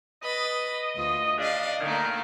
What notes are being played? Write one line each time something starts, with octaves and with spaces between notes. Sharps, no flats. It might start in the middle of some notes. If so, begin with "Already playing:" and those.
B4 D#5 B5 A6
D2 F4
C#3 D4 D5 D#5 F5
A#2 D3 D#3 A3 A#3